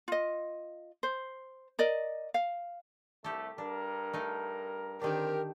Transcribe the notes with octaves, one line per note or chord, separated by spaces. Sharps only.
F4 D#5
C5
A#4 D5 D#5
F5
C2 A3 G4 A4
G2 D4 A#4
A3 D#4
D3 D#3 C4 D4 G4 A#4